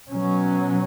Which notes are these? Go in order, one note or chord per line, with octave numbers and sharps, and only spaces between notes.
B2 F#3 C#4